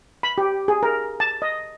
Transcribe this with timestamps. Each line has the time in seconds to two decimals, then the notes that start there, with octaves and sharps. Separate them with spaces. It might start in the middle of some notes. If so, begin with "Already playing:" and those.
0.23 B5
0.38 G4
0.68 G#4
0.83 A#4
1.20 A5
1.42 D#5